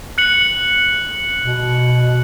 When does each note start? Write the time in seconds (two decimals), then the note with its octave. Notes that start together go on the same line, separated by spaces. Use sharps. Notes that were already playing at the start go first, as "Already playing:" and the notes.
0.18 F#6 C#7 F#7
1.43 B2